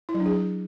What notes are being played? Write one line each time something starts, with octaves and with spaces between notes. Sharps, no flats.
E4
F#3
D4
G#4